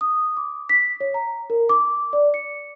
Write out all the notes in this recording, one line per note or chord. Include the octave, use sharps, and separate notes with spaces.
D#6
D6
B6
C#5
A#5
A#4
D6
D5
C#7